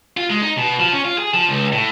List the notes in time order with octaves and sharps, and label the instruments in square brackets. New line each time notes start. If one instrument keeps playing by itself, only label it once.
[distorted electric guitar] F4
G#3
D#4
B2
F3
C#4
F4
G#4
F3
C#2
A2